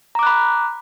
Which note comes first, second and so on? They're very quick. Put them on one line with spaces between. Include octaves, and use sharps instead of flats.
A#5 D6 F#6 B5